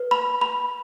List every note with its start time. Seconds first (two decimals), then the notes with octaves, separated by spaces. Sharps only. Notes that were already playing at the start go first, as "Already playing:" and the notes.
Already playing: B4
0.11 B5
0.41 B5